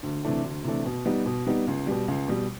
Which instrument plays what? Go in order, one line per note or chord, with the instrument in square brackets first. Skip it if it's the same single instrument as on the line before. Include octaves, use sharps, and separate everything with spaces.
[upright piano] D2
C3 E3 A3 D4
D2
C3 E3 A3 D4
B2
G3 B3 D#4
B2
G3 B3 D#4
C#2
B2 G3
C#2
B2 G3